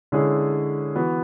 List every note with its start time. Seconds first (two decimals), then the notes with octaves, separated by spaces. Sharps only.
0.12 D3 G#3 C#4 E4 G#4
0.96 E3 B3 F#4